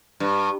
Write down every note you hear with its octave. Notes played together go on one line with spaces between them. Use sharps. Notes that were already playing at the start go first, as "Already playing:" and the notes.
G2